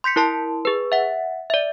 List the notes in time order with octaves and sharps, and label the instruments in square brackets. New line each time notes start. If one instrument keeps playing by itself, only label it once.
[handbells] C6 G6 B6 C#7
E4 A#4 A5 C6
G#4 B4
E5 F#5
D5 E5